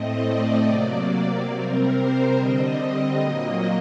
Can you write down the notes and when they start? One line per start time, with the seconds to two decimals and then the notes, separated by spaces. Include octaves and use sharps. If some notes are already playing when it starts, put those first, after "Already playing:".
Already playing: A2 A3 C4 D#5
0.23 D5
0.65 C3 F#3 A#3
1.50 C3 G3 C4 A#4
1.93 C5
2.35 D3 G3 C4 D#5
2.78 D#5
3.20 A#2 F#3 A#3